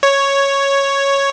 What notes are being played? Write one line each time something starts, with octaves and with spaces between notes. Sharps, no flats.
C#5